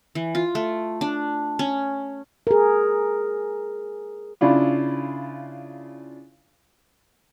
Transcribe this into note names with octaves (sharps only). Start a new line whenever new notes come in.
E3
F4
A3
D4
C#4
G#4 A#4
C#3 D4 E4 F4